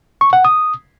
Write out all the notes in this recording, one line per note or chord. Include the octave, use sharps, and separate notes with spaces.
C#6
F#5
D#6